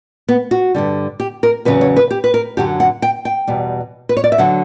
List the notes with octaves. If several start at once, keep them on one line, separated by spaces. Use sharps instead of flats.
B3
F#4
G2 D3 G3
G4
A#4
E2 C#3 F#3 B4
C#5
B4
G4
B4
A#4
F#2 D3 F#3 G4
F#5
G5
G5
E2 B2 G3
B4
C#5
D5
E5
D3 F#3 F#5